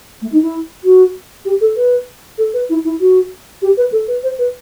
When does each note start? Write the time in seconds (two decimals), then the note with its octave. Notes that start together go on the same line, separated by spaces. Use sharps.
0.22 A3
0.32 D#4
0.42 E4
0.84 F#4
1.45 G4
1.61 A4
1.76 B4
2.38 A4
2.54 B4
2.70 E4
2.84 E4
3.00 F#4
3.62 G4
3.77 B4
3.92 A4
4.08 B4
4.23 C5
4.39 B4